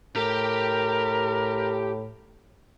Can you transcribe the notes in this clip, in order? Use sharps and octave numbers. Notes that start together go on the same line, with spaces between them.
A2 G4 A#4 G5